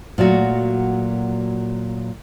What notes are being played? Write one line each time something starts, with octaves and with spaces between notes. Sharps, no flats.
A#2 F#3 A3 F#4